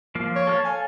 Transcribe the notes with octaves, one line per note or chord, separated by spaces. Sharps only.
F3 A#3 F5
C#5
A4 F5 A5
G#5